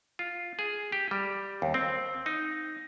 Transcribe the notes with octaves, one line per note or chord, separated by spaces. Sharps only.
F4
G#4
G4
G3
D#2
C4
D#4